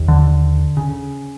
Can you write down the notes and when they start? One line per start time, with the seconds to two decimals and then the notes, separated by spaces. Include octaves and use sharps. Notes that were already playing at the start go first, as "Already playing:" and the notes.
Already playing: D#2
0.08 D3
0.77 C#3